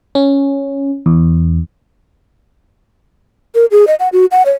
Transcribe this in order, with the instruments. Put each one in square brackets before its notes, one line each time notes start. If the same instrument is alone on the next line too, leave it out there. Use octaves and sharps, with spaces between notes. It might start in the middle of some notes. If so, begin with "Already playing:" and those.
[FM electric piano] C#4
E2
[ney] A#4
G#4
D#5
F#5
F#4
F#5
C#5